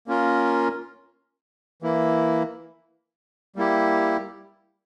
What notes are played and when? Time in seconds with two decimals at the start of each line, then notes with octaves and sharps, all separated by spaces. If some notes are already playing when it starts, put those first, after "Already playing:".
0.07 A#3 C#4 F4 A#4
1.82 E3 A#3 E4
3.56 G3 A#3 E4 G4